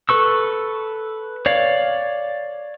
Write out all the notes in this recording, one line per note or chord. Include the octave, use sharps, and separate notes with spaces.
A4 B4 C#6 E6
C#5 D5 F5